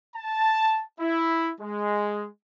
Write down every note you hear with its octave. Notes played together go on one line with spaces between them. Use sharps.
A5
E4
G#3